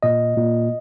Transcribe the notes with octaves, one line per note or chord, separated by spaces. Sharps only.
A#2 D#5
A#2